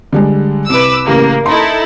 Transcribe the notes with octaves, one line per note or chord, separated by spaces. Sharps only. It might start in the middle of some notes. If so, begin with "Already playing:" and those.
D3 G3 G#3
C2 B4 D6 E6
A1 C#3 A#3 G4
D#4 E4 A4 C6